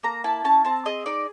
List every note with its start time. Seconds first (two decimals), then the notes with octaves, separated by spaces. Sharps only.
0.03 A#3 A#5
0.24 E4 A5
0.44 C#4 A5
0.65 C4 A5
0.85 G#4 D#5
1.06 D#4 D5